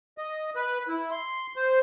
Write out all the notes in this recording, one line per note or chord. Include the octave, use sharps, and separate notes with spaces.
D#5
B4
E4
C6
C5